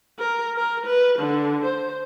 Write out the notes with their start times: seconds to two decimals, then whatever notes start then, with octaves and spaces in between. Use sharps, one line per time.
0.19 A#4
0.56 A#4
0.86 B4
1.19 D3
1.65 C5